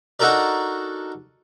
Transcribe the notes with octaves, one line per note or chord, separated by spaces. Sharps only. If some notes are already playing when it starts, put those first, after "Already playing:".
D4 D#4 F#4 A4 A#4 D5